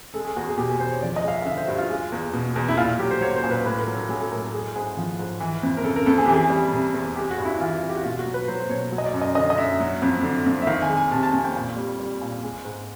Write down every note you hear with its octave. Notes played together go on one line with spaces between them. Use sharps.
G#3 A4
G#4
E2 F#4
G#4
B2 G4
G#4
E2 C5
C#5
F3 D5
D#5
G#3 F5
E5
F5
D3 E5
C5
G2 F#4
F4
G#3
E2
B2
E2
E4
A#2 F4
F#3 G4
C5
F#3 C#5
C5
A#2
B4
A2 B4
A#4
F#3
A4
F#3 G#4
A4
A2 A#4
A4
G#3 G#4
G#2 G#4
F3
G#2
E3
F2
A#4
C#3 A4
A#4
F2 A4
G#4
E3 G4
G#4
G3
C3
E2
G#3 G4
F#4
G2
E4
E3 F4
G2
G4
F#4
B2 F4
F#4
F#3
B4
F#3 C5
C5
B2 C#5
F#3
D#5
D5
F#2
D#5
D3 D#5
D#5
F#2 E5
F#3
F2
D3
F2
E5
D#3 F5
G#5
G#3
G#5
C3 A5
A5
F2 G#5
G5
A#2
G3
G3
A#2
G#3
G#2